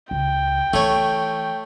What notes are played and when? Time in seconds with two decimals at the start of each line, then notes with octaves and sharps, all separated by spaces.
0.11 C#2 G5
0.73 E3 A3 C#5